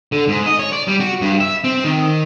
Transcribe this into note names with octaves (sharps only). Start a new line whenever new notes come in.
D3
G#2
D#5
C#5
D5
G3
F#4
G2
E5
C4
D#3